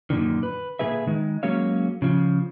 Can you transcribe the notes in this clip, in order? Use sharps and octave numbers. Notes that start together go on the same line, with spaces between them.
F#2 A#2 D3 D#3
B4
A#2 D3 G#3 G#4 B4 E5
D#3 G#3
F#3 G#3 A#3 C#4 C#5 F5
C#3 F3